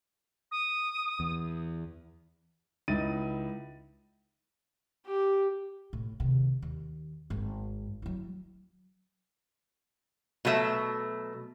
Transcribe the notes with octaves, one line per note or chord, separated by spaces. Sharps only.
D#6
E2
C#2 D#4 E4 D#5 A6 D#7
G4
A2
C3 D#3
D#2
G#1 G#2
F#3 E4
B2 F#3 A3 E5